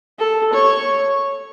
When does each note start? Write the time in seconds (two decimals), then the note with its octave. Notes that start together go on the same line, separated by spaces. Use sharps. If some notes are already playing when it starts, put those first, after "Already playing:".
0.19 A4
0.53 C#5